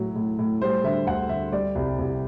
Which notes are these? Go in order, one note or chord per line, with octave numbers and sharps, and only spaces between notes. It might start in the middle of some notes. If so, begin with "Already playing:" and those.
Already playing: A2 F#3
A2
A2
G3 C5
D3 E5
D2 F#5
D2 E5
G3 D5
C2
C2